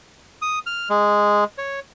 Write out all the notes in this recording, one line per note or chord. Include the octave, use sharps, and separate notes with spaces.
D#6
F6
G#3
C#5